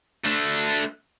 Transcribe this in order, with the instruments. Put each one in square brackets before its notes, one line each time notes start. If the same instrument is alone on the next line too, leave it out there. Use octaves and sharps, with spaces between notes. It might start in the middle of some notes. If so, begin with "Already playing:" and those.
[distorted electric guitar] A3 D4